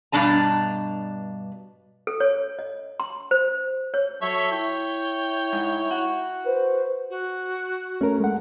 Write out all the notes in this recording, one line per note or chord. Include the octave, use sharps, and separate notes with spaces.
G2 B2 D4 A5 A#5
A4
C#5
D#5
C6
C5
C#5
F#3 A4 C#5 E5
E4 C#5 G5
G#2
F#4
B4 C5
F#4
A3 C#4 A#4
G#3 F#5